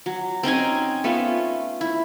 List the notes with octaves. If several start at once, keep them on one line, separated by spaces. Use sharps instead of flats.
F#3
C4 C#4 D#4 G#5
A3 B3 C#4 F4
E4